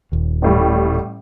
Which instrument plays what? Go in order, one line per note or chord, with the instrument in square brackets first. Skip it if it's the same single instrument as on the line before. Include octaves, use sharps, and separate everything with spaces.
[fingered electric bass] D#1 D#2
[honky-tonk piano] A1 A2 G3